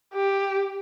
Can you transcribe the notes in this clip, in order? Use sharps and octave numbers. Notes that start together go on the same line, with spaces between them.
G4